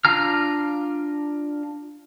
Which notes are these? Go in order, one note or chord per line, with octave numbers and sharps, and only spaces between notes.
D4 F4 A#5 F6